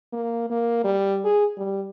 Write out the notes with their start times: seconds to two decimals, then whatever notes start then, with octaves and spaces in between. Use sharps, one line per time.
0.13 A#3
0.50 A#3
0.84 G3
1.25 G#4
1.58 G3